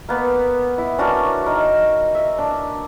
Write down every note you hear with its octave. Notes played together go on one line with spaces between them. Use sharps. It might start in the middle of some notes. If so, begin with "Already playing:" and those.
A#3 B3
E4
C#4 D4 F#4 A#4
D#4 A#4
E5
D4